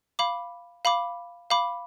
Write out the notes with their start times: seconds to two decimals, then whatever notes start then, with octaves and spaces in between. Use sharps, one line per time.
0.19 F5 B5 D6
0.85 F5 B5 D6
1.50 F5 B5 D6